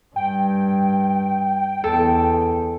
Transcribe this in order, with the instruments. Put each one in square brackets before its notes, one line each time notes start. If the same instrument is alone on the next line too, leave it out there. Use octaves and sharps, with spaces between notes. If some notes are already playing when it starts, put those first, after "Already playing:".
[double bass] G2 [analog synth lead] G5
[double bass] E2 [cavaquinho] A4